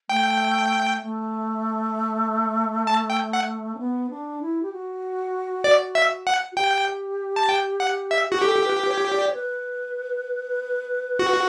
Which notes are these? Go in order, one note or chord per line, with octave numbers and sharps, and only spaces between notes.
A3 G5
A3
A5
G5
F#5
C#4
B3
D4
E4
G4
F#4
D5
E5
F#5
F#4
G4 G5
A5
G5
F#5
E5
F#4 G4
G4 A4
B4
C#5
D5
C#5
B4
F#4